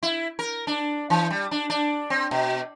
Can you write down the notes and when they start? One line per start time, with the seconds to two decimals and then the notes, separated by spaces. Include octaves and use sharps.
0.03 E4
0.39 A#4
0.67 D4
1.10 E3
1.30 G3
1.51 D4
1.70 D4
2.10 C4
2.31 B2